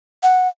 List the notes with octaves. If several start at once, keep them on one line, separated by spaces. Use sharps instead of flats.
F#5